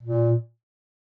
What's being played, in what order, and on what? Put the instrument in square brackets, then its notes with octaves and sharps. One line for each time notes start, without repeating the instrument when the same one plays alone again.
[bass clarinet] A#2